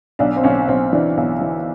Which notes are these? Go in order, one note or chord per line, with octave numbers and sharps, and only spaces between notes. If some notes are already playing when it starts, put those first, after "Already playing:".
B1 D4
C4
B1 C#4
B1 C4
E3 D4
B1
E3